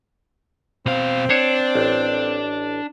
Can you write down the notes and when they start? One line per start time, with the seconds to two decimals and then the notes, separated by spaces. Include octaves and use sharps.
0.86 B2 C4 F5
1.30 D4 C5 C#5
1.75 A1